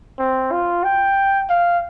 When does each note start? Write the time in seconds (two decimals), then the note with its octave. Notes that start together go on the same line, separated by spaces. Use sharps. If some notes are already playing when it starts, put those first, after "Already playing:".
0.19 C4
0.52 F4
0.84 G5
1.50 F5